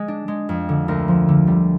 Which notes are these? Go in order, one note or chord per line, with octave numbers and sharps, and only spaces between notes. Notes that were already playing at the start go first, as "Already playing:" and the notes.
Already playing: G#3 G#4
D4
G#3
F2
D3
D2 A#4
F3
D3
G3